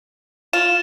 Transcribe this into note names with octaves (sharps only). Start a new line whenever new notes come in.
F4 E7